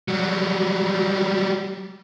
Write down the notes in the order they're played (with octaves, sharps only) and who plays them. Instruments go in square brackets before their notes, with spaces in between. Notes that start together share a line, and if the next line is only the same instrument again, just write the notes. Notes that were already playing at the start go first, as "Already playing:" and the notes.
[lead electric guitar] F#3 G3